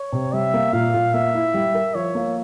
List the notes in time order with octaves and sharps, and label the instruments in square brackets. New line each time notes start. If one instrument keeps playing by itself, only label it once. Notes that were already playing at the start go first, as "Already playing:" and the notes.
Already playing: [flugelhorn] C#5
[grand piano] C3
[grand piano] G3 [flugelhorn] E5
[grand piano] A#3
[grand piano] A#2 [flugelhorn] F5
[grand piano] A#2
[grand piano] A#3 [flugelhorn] E5
[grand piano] E4
G3
A#4
[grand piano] F3 [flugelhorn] C#5
[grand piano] A#3